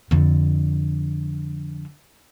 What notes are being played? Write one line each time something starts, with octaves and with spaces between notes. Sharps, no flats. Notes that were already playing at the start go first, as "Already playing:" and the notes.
F2 D3